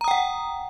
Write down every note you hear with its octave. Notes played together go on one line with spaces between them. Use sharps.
F#5 G5 A#5 D#6